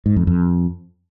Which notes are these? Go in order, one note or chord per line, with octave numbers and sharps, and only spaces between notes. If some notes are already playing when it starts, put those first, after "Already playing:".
G#2
F2
F2